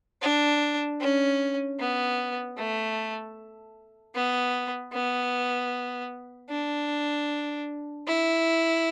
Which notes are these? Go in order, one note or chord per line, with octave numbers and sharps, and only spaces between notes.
D4
C#4
B3
A3
B3
B3
D4
E4